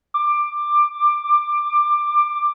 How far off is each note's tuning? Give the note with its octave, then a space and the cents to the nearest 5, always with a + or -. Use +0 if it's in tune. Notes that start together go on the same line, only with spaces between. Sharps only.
D6 +15